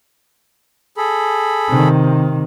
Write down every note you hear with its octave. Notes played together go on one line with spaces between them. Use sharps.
G#4 A4 B5
C3 D#3